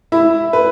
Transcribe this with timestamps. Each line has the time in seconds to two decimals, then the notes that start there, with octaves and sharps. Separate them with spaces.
0.12 E4 E5
0.53 B4